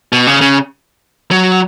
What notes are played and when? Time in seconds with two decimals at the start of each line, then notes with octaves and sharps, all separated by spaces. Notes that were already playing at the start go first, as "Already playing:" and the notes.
0.12 B2
0.27 C#3
0.41 C#3
1.31 F#3